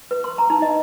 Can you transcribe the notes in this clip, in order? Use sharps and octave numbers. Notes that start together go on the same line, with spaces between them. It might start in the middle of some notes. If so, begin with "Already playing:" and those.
B4
C6
A#5
D#4
D#5